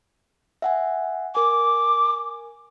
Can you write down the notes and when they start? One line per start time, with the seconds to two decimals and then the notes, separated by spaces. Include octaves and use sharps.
0.62 E5 F#5 G#5
1.35 A#4 G#5 D6